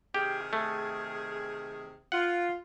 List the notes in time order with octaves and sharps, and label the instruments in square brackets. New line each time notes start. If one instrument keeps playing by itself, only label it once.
[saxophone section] C3 D#3 G#4 [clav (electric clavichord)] G4
[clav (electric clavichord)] A3
[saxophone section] F4 [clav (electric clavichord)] F#5